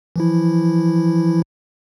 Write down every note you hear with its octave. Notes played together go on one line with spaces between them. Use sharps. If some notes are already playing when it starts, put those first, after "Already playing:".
E3 F3 E4